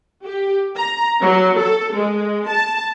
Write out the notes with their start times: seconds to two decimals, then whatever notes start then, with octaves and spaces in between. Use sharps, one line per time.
0.24 G4
0.75 A#5
1.22 F#3
1.58 A4
1.94 G#3
2.49 A5